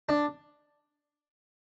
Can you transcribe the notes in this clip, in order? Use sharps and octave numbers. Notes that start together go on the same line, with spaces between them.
D4